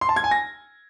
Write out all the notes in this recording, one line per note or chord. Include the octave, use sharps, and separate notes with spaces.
C6
A5
G#6
G#5
A#6